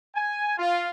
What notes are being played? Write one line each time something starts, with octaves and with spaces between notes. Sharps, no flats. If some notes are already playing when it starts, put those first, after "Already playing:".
G#5
F4